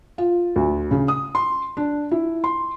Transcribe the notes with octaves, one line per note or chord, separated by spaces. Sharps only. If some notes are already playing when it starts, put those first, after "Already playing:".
F4
D2
C#3
D#6
C6
D4
E4
C6